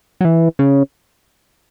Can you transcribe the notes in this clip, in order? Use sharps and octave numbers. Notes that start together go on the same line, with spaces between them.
F#3
E3
C#3